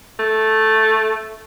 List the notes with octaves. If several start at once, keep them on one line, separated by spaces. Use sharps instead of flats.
A3